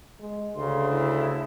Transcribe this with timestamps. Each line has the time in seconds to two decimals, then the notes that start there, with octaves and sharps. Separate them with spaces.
0.21 G#3
0.55 D2 C#3 C6
0.91 E4